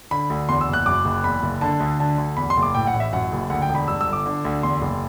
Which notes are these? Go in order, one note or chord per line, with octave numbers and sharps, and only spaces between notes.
D3 B5
D2
E2 C6
E6
F#1
F#6
F#2 D6
F#1
E2 B5
F#1
D3 A5
D2
D3 A5
D2
E2 B5
C6
F#1
D6
A2 G5
F#5
A1
E5
F#2 F#5
F#1
D2 F#5
G5
E1
B5
G2 E6
E6
G1
D6
D3
D2
E2 C6
F#1